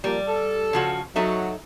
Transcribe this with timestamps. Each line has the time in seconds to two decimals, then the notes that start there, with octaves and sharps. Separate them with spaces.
0.04 F3 G3 A#3
0.27 A4
0.73 C#3 F3 F#4
1.16 F#3 D#4 A4 E5